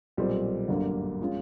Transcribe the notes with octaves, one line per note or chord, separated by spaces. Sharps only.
B1 A#2 G3 C4
G1 F#2 D3 G3 A#3
F3 G#3 C#4 F4